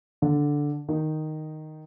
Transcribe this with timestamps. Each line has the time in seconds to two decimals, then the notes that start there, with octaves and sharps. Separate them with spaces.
0.22 D3 D4
0.88 D#3 D#4